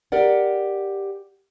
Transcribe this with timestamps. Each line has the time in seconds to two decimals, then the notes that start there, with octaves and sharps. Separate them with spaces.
0.12 G4 A#4 D5 F#5